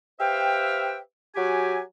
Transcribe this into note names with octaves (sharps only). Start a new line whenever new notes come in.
G4 B4 C5 E5 F5 G5
F#3 F#4 G4 G#5